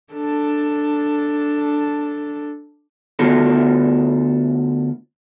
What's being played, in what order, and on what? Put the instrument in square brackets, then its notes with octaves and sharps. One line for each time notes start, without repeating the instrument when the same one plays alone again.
[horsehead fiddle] D4 A4
[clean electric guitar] D2 B3 F4 F#4 A4